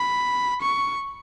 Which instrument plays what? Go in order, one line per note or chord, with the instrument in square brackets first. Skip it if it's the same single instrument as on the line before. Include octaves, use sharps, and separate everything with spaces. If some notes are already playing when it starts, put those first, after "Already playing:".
Already playing: [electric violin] B5
C#6